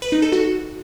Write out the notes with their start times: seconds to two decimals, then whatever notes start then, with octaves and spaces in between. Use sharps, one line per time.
0.02 B4
0.12 D#4
0.22 A4
0.32 F#4